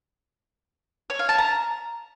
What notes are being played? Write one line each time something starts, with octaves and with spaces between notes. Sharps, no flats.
C#5
F5
A5
A#5